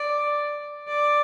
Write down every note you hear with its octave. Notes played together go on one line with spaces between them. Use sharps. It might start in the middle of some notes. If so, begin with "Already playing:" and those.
Already playing: D5
D5